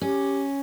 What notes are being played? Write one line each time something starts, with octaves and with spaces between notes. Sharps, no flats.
C#4 G4